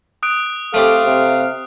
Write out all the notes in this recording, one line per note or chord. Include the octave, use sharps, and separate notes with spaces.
D#6 F#6 D7
A3 C4 G4 A4 F5
C3